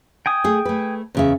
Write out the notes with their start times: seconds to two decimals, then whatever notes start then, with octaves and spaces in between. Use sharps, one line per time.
0.26 G5 G#5 D#6
0.44 A3 G#4
0.65 A3 B4
1.15 E2 C#3 E5